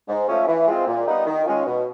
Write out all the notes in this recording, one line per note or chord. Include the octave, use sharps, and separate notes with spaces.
G#2
F3 A3 C#4
E3
G#3 C4 F4
A#2
G3 B3 D#4
D#3
G#3 C#4 F4
B2